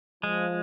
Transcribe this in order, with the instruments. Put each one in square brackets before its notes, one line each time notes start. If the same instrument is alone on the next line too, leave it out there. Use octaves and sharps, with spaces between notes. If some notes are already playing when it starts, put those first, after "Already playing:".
[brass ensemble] F3 [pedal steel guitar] G#3